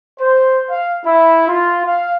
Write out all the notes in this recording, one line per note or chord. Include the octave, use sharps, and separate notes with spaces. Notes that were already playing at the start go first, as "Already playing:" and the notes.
C5
F5
E4
F4
F5